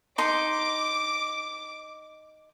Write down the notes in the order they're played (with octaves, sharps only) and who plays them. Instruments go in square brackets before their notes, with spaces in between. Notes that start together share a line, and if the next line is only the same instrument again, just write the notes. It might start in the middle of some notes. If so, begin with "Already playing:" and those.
[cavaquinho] D#4 C6 [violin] D6 D7